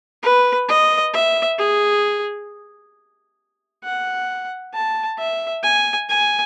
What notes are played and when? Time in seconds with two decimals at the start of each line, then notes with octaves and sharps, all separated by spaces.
0.23 B4
0.68 D#5
1.13 E5
1.59 G#4
3.84 F#5
4.74 A5
5.18 E5
5.63 G#5
6.10 G#5